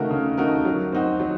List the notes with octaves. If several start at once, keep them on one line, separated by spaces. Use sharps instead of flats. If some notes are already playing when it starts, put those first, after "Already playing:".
Already playing: C#3 A3 D#4 F#4 A#4
C#3
A3 D#4 F#4 A#4
F#3
C4 D#4 F#4
F#3